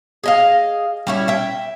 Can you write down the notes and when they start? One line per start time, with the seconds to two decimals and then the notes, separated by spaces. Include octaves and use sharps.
0.24 G#4 D#5 F5
1.07 G3 C#4 E4
1.28 E5 G5